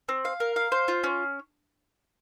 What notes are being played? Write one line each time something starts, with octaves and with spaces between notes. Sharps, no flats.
C4
F5
A#4
F5
C5
F4
C#4